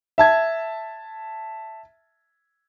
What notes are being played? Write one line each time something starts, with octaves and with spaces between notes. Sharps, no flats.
E5 A5 G#6